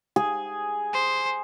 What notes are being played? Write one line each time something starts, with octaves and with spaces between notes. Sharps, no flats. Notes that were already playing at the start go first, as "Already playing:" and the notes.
G#4
C5